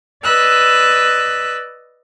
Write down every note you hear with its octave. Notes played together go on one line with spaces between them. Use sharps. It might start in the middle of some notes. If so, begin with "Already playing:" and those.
B4 D5 D#5 E6 F#6